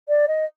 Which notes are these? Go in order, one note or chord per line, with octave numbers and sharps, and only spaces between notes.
D5
D#5